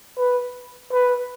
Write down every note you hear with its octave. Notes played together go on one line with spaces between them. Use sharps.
B4
B4